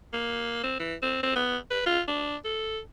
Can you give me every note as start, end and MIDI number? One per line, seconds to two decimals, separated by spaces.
0.13 0.62 58
0.63 0.76 60
0.79 0.95 52
1.02 1.21 60
1.23 1.32 60
1.36 1.57 59
1.71 1.85 71
1.86 2.01 65
2.08 2.36 62
2.44 2.80 69